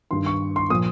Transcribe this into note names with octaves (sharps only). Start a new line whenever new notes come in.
G2 D#3 C6
C#6
C6
A#2 F3 D#6